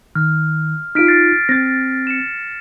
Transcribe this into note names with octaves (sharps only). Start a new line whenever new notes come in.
D#3 F6
D#4 F4 F6 B6 D7
A6 C7
C4 A6 A#6
C#7 E7